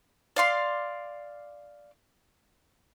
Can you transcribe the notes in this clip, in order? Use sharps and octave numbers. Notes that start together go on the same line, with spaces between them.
D5 F5 C6